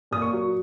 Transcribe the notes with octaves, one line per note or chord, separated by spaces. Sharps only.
A#2 D#6
C#6
F#3